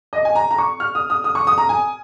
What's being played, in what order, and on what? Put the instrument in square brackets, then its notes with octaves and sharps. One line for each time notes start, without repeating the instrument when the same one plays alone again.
[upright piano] D#5
G#5
A#5
A#5
C#6
F6
D#6
D#6
D#6
C#6
D#6
A#5
G#5